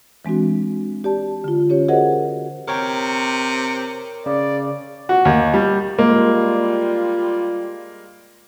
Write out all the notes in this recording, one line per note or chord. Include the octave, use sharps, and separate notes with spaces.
E3 G#3 C4 D4 F#4
G4 D5 A5
D3 F4
C#4 G4 C#5
F#4 G#4 A#4 C5 D#5 F#5
C3 A#4 C#5 G5
C#3 D5
F#4
D#2
G3
G3 G#3 A#3 F4